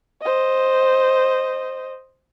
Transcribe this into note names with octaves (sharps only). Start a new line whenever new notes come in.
C5 D#5